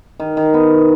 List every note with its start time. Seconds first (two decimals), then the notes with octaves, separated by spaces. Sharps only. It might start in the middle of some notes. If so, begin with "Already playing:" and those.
0.20 D#3
0.37 D#3
0.54 B3